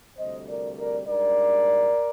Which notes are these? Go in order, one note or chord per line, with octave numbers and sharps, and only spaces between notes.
D2 C3 G3 C5 D#5
A#4 D5
A#4 D5
G#2 G3 D4 A#4 D5